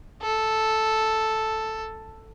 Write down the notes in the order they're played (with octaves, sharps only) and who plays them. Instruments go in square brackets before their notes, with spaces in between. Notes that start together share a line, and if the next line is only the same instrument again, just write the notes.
[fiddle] A4